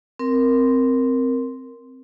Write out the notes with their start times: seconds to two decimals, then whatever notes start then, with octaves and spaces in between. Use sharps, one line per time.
0.19 C4 A#4